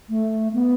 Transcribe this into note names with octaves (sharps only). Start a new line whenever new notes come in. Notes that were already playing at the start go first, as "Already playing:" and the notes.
A3
B3